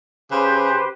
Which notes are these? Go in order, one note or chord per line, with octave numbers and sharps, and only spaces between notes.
C#3 G4 B4 C5